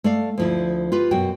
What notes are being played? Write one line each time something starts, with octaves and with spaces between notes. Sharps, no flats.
A3 D5 F5
D2 F3 E4
F4 G4 B4
F#2 B2 F#4 G5